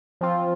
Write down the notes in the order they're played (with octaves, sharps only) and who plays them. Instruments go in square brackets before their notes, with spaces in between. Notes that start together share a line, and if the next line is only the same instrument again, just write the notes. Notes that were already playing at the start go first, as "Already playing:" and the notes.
[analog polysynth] F3 C4 F4